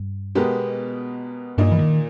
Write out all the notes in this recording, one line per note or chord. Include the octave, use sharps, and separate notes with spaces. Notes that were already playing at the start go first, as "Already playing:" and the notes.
Already playing: G2
B2 G#3 B3 G4 A#4
G2 A#2 A#3 D#4
E3
D#3